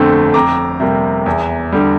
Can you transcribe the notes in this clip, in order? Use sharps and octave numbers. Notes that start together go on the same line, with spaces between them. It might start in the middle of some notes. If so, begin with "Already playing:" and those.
Already playing: G1 F2 D3 A3 C4
F2 A#5 D6
C3 G3 A#3
E2
D3 G3